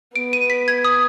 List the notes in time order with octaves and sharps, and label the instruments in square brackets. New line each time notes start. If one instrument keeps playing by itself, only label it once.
[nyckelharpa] B3 [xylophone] D7
[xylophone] D#7
B6
G#6
D#6